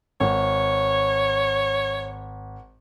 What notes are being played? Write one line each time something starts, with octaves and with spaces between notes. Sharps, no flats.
G#1 C#5